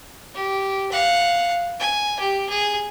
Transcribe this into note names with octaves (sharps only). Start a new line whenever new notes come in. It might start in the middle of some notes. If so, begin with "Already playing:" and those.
G4
F5 F#5
G#5
G4
G#4